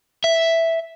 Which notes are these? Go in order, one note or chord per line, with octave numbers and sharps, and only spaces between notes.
E5